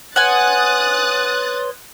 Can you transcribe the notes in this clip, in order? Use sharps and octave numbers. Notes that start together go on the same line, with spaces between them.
B4 C#5 F#5 G#5 C6 D#6 F#6 A6